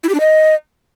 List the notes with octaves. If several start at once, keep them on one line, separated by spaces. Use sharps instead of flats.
E4
G4
D4
D#5